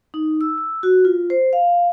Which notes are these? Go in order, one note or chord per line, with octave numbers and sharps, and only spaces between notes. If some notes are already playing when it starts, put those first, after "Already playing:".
D#4
E6
E6
F#4
F4
C5
F5